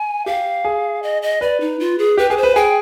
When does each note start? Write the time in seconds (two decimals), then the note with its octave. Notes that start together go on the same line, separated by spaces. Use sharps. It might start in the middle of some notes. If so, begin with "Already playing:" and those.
Already playing: G#5
0.26 G4 F5
0.65 G#4
1.03 D#5
1.22 D#5
1.41 B4 D5
1.61 D#4
1.80 F4
1.98 G#4
2.17 G4 B4
2.30 G#4 B4
2.37 C5
2.43 B4
2.56 G#4 G5